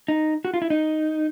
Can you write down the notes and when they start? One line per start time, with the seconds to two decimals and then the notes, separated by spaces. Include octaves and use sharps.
0.08 D#4
0.45 F#4
0.54 F4
0.62 E4
0.70 D#4